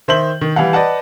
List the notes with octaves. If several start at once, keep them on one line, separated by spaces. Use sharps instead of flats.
D#3 C5 E5 G6 F#7
D#3
E3 G3 F5 F#5
B4 D5 D#5 F#5 A5